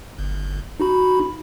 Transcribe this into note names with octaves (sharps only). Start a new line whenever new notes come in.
G1
D#4 F#4 B5